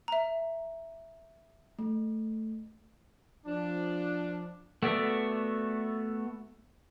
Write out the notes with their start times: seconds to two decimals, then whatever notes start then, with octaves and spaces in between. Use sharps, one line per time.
0.08 E5 A#5
1.79 A3
3.45 F3 D4
4.83 A3 B3 F#4 D5 E5